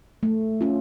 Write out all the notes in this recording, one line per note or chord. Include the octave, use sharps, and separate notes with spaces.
A3
C#4 F4